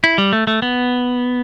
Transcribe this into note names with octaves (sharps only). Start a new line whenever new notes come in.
E4
G3
A3
A3
B3